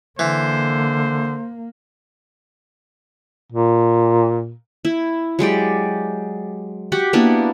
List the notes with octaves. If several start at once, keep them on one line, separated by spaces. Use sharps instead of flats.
D3 E3 A#3 C5
A#2
E4
F#3 G#3 G4 D5
F#4 G4 F#5
A#3 B3 D4 E4